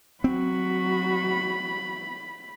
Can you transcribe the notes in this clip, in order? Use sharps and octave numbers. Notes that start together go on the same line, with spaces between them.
F#3 C4 F#4 B5